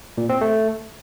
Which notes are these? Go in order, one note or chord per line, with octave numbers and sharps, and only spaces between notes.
A#2
C4
A3